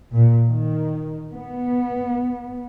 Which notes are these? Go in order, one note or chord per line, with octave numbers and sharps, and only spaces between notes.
A#2
D#3
B3